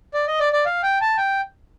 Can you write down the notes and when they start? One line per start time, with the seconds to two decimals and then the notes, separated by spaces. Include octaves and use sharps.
0.14 D5
0.28 D#5
0.40 D5
0.53 D5
0.66 F5
0.83 G5
1.01 A5
1.18 G5